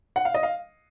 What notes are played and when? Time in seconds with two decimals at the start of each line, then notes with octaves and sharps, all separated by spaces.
0.16 F#5
0.25 F5
0.34 D#5
0.43 F5